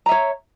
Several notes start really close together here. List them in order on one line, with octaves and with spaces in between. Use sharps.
A#5 E5 C#5